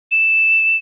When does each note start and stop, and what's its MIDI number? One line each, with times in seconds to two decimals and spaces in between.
0.11 0.77 100